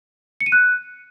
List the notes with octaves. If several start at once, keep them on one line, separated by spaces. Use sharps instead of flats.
C#7
D#7
F#6